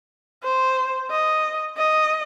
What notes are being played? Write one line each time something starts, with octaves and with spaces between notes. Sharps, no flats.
C5
D#5
D#5